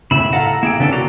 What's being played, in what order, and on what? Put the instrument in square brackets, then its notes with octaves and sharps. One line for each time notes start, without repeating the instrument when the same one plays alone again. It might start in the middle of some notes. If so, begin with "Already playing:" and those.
[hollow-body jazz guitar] C#2 A2 C#3 [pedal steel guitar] E5 B5
[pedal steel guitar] A4 A#5 [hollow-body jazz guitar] F5 F#5
[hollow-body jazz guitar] A#3 [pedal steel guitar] E4 G#4 G5
[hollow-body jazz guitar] C#3 C#4 D4 [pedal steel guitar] B3 A4
[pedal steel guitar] A#3 D5 A#5 [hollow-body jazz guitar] F#4